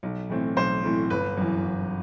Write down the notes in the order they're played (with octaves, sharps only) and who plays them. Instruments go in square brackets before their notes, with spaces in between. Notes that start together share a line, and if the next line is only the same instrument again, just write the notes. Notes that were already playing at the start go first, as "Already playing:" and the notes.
[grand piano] B1
A2 E3 A3 C4
B1 C5
A2 E3 A3 C4
G1 B4
F#2 E3
G1